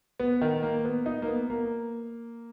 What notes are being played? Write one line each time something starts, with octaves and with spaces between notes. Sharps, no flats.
B3
D#3
A#3
B3
D#4
A#3
B3
A#3